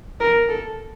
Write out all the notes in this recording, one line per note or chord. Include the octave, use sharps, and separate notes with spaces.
A#4
A4